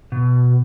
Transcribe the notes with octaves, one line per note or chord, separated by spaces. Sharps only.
B2